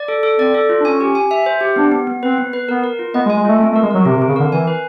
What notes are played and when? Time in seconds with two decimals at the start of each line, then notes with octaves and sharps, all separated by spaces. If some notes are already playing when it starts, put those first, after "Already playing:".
Already playing: D5
0.08 A4
0.23 A4
0.38 C4 D5
0.54 A4
0.69 F4
0.80 D4
0.85 C#4 G#5
1.01 G4
1.15 G#5
1.31 E5
1.46 C5
1.61 G4
1.76 B3 D4
1.92 B3
2.07 B3
2.23 C4 B4
2.38 B3
2.53 B4
2.69 B3 A#4
2.84 A#4
2.99 F4
3.14 B3 D#5
3.26 G#3
3.30 G#5
3.37 G#3
3.45 A3 F4
3.59 A3 C4
3.72 A3
3.76 A#4
3.83 G#3
3.91 F#3 A#4
4.05 C3 C4
4.17 C3
4.22 C4
4.29 C#3
4.36 D3 A#4
4.51 E3 G#5
4.67 B4